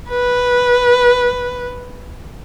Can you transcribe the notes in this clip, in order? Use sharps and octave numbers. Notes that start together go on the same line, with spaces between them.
B4